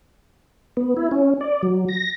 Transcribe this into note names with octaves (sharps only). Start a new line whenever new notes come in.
B3
E4
C#4
D5
F#3
A#6